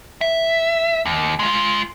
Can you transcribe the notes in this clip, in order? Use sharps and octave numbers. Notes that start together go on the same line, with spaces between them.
E5
D#2
G#3 F4